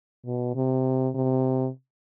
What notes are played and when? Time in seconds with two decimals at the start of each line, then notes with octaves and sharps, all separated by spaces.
0.25 B2
0.55 C3
1.15 C3